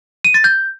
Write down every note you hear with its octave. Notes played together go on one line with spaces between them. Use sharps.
D#7
A6
G6